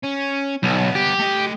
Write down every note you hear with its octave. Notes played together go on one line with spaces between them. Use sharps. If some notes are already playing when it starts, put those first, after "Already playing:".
C#4
B1 G3 B3
G4
A3 D#5